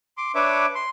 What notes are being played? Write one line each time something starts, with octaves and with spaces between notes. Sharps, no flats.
C6 D6
D4 B4 C#5 E5 D6
C6